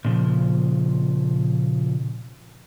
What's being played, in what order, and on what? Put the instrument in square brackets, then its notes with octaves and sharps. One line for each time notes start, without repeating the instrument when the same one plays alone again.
[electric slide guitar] A#2 C#3 F3